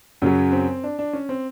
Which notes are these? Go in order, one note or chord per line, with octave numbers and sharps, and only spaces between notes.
F#2 C#3 F#3 C#4
C4
D4
D4
C#4
C4